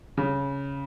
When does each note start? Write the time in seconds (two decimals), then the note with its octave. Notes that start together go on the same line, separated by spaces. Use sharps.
0.17 C#3